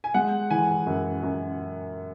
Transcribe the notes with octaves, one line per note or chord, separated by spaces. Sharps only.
G#5
G#3 F#5
E3 G#5
F#2
F#2